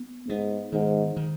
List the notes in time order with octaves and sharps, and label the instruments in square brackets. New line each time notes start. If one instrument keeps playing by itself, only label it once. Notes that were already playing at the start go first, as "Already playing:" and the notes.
Already playing: [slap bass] B3
[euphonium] G#2 [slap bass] B3
[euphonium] G#2 [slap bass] D#3
[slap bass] D#3